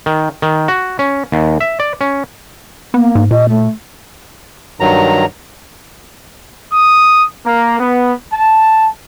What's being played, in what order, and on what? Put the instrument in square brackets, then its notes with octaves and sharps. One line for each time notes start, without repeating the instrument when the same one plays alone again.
[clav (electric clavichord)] D#3
D#3
F#4
C#4
D#2
E5
D5
C#4
[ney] A#3 [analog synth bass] B3
[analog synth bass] G#2
[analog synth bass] A#2 [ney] D#5
[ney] A3
[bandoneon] G2 D#3 F#3 A#5
[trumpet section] D#6
A#3
B3
A5